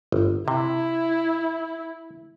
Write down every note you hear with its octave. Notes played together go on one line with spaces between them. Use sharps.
G1
C3 E4